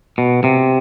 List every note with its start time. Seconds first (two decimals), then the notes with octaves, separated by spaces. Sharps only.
0.18 B2
0.44 C3